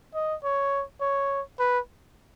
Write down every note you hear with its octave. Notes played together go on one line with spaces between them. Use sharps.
D#5
C#5
C#5
B4